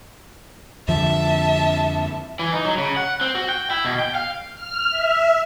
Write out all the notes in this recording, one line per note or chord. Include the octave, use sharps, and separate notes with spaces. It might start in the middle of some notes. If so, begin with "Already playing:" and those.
F2 D3 F3 E5 A5
E3
D#4
F#3
C#3
F#5
C4
F#4
G5
E4
B2
G5
F5
F6
E5